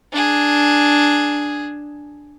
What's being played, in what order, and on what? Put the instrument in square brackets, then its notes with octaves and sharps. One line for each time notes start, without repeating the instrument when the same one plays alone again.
[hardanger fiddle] D4 G#4